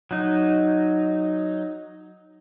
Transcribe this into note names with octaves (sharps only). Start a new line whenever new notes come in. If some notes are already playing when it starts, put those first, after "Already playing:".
F#3 D#4